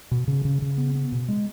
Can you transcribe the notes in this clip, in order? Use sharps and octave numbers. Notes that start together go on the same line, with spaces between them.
B2
C#3
C#3
C#3
B3
B3
B2
G#3